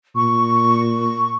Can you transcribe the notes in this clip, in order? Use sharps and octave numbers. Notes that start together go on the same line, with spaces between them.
A#2 C#6